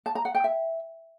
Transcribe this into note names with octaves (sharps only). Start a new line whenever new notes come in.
A5
A#5
F#5
G5
E5